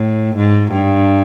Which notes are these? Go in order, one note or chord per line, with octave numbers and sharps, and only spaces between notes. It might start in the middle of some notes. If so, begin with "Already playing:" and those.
Already playing: A2
G#2
G2